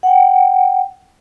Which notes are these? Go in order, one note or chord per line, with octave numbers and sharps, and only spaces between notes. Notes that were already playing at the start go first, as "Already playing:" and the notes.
F#5 G5